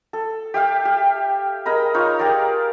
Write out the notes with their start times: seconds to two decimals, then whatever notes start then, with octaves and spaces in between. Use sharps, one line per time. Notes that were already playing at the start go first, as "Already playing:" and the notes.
0.13 A4
0.54 G4 E5 F5 G5
0.85 G4
1.66 G#4 A#4 D#5 B5
1.94 D#4 F4 C#5
2.19 G4 G#4 A#4 D5